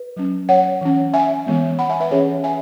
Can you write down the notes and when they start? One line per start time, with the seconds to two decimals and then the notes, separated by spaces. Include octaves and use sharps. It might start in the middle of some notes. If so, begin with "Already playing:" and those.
Already playing: B4
0.17 F#3 C#4
0.49 C#5 F#5
0.81 E3 C#4
1.14 E5 G#5
1.47 E3 G#3 B3
1.79 F#5 B5
1.89 E5 G#5
2.00 B4 E5
2.11 E3 C#4 G#4 C#5
2.44 E5 G#5